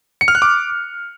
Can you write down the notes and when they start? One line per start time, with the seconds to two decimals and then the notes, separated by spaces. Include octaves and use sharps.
0.21 C#7
0.28 F6
0.35 F#6
0.42 D6